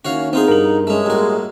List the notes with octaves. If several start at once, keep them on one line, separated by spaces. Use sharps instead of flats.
D#3 A#3 C#4 E4 F#4 C#5 F5
B3 C4 D#4 F4 G#4
G2 G3 A#4 F#7
G#3 A3 C#4
A2 G3 A#3 F#4